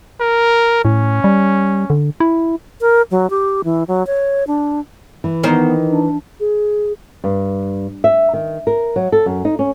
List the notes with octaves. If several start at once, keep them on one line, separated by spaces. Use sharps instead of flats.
A#4
A2 C#4
G3
D3
E4
A#4
F#3
G4
E3
F#3
C#5
D4
E3
D#3 B3 C5
D4
G#4
G2
E5
D#3
A#4
F#3
A4
F#2
D#4
C#4